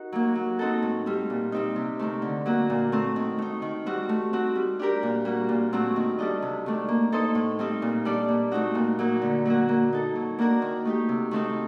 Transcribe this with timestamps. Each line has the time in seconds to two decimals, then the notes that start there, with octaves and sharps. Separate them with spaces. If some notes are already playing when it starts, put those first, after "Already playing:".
Already playing: D#4 F#4 A#4
0.12 F#3 A#3
0.35 F#3
0.59 C4 D#4 F#4 A4
0.82 A2
1.06 G3 C4
1.30 A#2
1.52 G3 C4 D#4
1.76 C3
1.99 D#3 A3 C4
2.22 D3
2.46 F#3 A#3 F#4
2.70 A#2
2.92 A3 C4
3.16 D#3
3.38 A3 D#4
3.62 D#3
3.86 G3 C4 F#4
4.09 A3
4.33 C4 F#4
4.56 G3
4.79 D4 G4 A#4
5.03 A#2
5.25 G3 A#3 F#4
5.49 A#2
5.73 F#3 A3 C4 F#4
5.96 D#3
6.19 G3 D4 A4 D#5
6.42 C3
6.66 D#3 A3 D4
6.88 A#3
7.12 D#4 A4 C5 D#5
7.35 A2
7.59 G3 C4 D#4
7.82 A#2
8.05 G3 D4 A4 D5
8.28 A#2
8.51 A3 C4 D#4 F#4
8.75 A#2
8.99 F#3 A#3 D#4
9.22 D3
9.45 F#3 A#3 F#4
9.69 A#3
9.93 D#4 A4
10.15 F#3
10.39 A#3 D4 F#4 A#4
10.62 D#3
10.85 A3 D#4 G4
11.09 C3
11.31 D#3 A3 C4 D#4